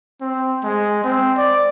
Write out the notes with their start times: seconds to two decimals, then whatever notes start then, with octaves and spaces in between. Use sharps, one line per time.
0.21 C4
0.64 G#3
1.04 C4
1.38 D5